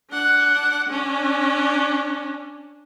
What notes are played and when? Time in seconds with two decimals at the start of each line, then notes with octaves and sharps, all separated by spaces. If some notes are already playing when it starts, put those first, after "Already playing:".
0.11 D4 F#5
0.89 C#4 D4